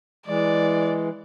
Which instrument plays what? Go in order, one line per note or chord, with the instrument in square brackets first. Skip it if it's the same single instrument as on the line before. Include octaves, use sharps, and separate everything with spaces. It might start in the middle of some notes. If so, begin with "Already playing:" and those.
[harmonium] E3 G#3 [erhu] D5